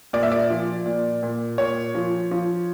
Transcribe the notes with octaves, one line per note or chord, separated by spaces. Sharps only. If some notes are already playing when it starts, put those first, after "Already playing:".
A#2 D5
E5
D5
F3
A#2
A#2
A#2 C#5
F3
F3